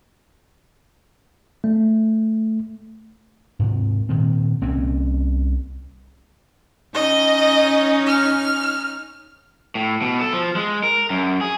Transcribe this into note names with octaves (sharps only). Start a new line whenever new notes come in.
A3
G#2 C3
A#2 D#3 C4
C2 A#3 C4 C#4
C#4 D#4 D#5
F6
A2
B2
A4
F3
G#3
A#4
F#2
G#4